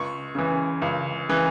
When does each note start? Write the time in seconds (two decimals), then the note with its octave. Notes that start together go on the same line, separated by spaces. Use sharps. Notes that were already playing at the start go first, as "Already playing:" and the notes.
Already playing: C#2 C#6
0.35 C#3 E3
0.82 C#2
1.29 C#3 E3